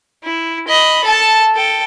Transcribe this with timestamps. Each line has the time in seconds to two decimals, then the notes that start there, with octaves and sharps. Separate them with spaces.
0.24 E4
0.68 D#5 B5
1.04 A4 A5
1.55 A4 G5